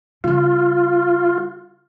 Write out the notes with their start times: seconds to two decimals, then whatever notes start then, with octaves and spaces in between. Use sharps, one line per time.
0.24 C#3 G3 F4